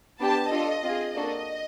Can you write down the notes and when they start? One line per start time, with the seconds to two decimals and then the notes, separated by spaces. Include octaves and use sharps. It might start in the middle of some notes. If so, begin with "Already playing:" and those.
0.20 B3 D4 G4 A5
0.51 D4 F4 A4 D#5
0.83 C4 F4 G#4
1.14 A#3 D4 F#4 A4 D#5